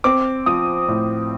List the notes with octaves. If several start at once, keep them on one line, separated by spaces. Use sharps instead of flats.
C4 D6
F3 D#6
A2